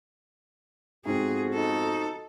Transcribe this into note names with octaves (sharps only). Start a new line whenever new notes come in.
F2 G#2 B3 C4 F#4 G#4
D#4 A4